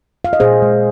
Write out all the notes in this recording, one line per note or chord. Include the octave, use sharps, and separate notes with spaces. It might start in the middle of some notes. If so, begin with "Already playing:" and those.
F5
D#5
A#2 G#4 C5
G#3